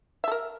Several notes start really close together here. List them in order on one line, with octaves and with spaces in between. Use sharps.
E5 A4 A#4